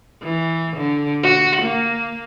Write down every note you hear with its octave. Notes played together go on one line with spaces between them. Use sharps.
E3
D3
F#4
A#3